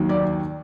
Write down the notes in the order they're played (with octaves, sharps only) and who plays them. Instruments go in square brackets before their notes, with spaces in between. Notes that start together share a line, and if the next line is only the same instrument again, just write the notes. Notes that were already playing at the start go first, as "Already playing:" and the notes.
Already playing: [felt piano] D#2 D#3 F#3
D5